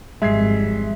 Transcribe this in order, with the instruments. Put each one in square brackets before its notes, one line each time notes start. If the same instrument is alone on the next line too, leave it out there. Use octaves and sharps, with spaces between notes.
[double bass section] G#1 F2 G3 [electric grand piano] G#3 G#6 C7 [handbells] E5